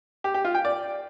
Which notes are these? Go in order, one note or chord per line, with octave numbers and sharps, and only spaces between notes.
G4
G4
F4
G5
D5